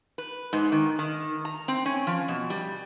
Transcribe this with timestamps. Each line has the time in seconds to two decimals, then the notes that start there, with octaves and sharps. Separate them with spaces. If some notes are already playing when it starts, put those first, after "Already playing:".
0.18 B4
0.53 G#2
0.72 D#3
0.99 D#3
1.45 A#5
1.68 C4
1.86 C#4
2.07 F3
2.28 B2
2.50 G3